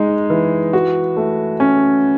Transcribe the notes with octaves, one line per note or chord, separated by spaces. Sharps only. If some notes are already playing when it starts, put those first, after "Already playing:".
Already playing: G#3 D#4
E3
F#4
A3
C#4